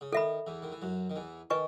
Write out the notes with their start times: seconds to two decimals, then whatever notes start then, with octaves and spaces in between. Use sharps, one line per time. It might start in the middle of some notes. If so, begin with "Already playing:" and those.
0.01 C#3
0.13 D#3 A4 E5 B5
0.47 E2 E3
0.62 D#3
0.72 E3
0.82 F#2 F#3
1.10 D#3
1.16 E2 E3
1.50 D#3 B4 D#5 G#5 C#6